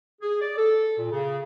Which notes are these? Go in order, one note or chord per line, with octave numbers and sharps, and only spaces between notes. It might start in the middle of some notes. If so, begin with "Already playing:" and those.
G#4
D5
A4
A#2
C#3